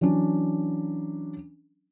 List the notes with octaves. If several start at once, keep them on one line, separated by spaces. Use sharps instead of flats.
E3 F#3 C#4 D4